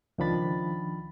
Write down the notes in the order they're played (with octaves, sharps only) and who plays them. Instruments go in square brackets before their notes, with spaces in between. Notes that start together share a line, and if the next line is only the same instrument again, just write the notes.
[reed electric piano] C#2 D#3 F3 D4 B5 A6